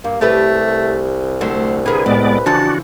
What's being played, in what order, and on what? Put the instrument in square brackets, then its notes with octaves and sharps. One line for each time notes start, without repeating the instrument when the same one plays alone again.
[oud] G2 [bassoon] A#3
[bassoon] C2 [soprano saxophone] A3 [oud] G4 A4 B4
[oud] D3 F#3 A3 [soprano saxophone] C5
[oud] D3 A#4 [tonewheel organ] G#4 [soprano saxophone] B4
[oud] A2 [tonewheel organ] G#3 B3 D5
[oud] C#3 E3 F3 [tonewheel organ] D4 F#4 [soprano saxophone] A5